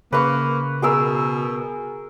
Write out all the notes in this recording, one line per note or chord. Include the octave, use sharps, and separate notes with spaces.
C#3 A#3 B4 C#6
B2 G#4 A#4 E6